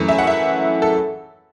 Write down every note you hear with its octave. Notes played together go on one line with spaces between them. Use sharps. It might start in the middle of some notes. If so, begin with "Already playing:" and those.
Already playing: F#2 E3 A3
E5
F#5
E5
A4